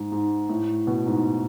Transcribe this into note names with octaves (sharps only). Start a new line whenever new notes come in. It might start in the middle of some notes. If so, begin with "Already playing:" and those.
Already playing: G#2
G#2
A2
B2
G#2